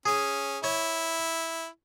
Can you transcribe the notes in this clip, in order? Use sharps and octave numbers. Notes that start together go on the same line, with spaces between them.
C#4 G#4
E4 C#5